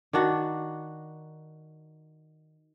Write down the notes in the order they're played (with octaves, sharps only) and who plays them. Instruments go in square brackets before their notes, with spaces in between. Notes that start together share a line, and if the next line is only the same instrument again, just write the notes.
[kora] D#3 D4 F#4 F#5